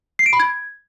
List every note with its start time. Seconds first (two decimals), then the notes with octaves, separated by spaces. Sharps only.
0.19 C7
0.26 D7
0.33 B5
0.40 G#6